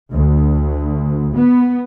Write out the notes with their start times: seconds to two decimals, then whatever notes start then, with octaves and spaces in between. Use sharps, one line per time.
0.12 D2
1.36 B3